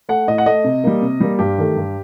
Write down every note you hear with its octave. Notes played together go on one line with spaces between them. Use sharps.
A3 F#5
A2 D#5
F#5
A3 D#5
C3
G3 A#3
C3
G3 A#3
G2 G4
D#3 A3
G2